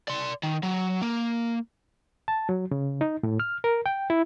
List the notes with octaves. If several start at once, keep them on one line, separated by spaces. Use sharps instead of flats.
D5 C6
D#3
F#3
A#3
A5
F#3
C#3
D#4
A2
F6
A#4
G5
E4